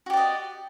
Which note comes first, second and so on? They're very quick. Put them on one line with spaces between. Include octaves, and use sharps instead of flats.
F#4 G4 D5 D#5